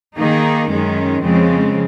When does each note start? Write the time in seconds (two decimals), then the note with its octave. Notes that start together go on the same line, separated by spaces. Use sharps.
0.16 D#3 A#3 D#4 G#4
0.69 F#2 D#3 G#3 C#4
1.23 F2 C#3 F3 G#3 C4